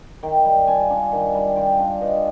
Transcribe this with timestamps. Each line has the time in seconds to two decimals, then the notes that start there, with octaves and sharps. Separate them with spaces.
0.23 D#3 G5
0.45 G3
0.67 F4 G#5
0.90 D4
1.12 D#3
1.35 G3
1.56 F4 G5
1.79 D4
2.01 G2 D#5